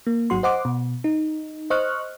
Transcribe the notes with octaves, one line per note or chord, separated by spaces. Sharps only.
A#3
G#1 F#3 F#4 C6
C5 D#5 F#5 C6 D6
B2
D#4
C5 D#5 C#6 F6 F#6